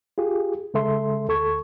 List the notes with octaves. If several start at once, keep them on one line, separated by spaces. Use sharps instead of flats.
F4 G4 G#4
C#3 G#3 A4 E5 C6
D2 A4 C#6 G#6